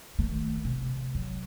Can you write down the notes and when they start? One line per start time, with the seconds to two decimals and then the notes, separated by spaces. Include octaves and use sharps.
0.19 D#3 A3
0.65 C3
1.15 F#3